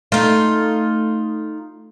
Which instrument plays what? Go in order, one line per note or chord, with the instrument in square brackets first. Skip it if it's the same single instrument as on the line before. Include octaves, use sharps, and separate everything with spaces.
[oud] A3 [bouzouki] D#4 F4